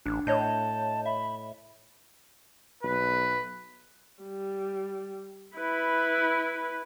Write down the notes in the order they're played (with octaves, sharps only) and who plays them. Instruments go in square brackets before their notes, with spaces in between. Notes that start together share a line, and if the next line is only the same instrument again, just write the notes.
[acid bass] A1 [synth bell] D4
[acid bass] A2 [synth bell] C#5 D#5 G6 [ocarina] A5
[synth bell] E5 [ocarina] B5
[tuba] B1 [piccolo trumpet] B4
[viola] G3
E4 B4